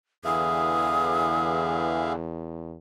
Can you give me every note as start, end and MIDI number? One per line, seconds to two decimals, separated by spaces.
0.25 2.77 40
0.25 2.15 50
0.25 2.15 52
0.25 2.13 68
0.25 2.13 76
0.25 2.13 77
0.25 1.91 87